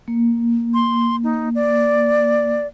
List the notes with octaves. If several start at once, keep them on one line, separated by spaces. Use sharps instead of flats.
A#3
C6
D#4
D5